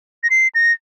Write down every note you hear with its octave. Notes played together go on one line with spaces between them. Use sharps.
A#6
C7
A#6